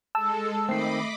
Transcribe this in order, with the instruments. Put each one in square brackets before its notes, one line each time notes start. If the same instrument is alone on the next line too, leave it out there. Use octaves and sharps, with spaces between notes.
[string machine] G#3 A4 [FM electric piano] A5 E6
[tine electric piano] D#3 C4 [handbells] A3 C7 [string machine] D#5 B5 D6